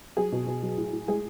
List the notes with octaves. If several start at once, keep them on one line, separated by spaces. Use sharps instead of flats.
F#3 G#4
B2
B2
F#3
A2
A2
G#3 G#4